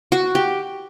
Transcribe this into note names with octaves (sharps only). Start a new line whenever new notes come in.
F#4
G4